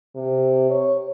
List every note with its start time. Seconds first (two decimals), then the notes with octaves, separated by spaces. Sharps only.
0.16 C3
0.70 C#5